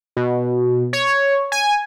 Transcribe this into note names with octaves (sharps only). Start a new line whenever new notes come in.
B2
C#5
G#5